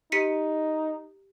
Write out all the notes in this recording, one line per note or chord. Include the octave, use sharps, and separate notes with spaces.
D#4 G4 B6 C#7